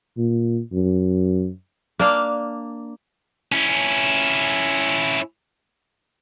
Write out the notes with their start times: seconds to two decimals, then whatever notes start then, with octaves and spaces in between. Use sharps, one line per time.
0.18 A#2
0.73 F#2
1.99 A#3 D4 F5
3.52 C#4 E4